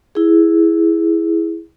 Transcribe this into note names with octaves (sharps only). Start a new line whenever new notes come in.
E4 G#4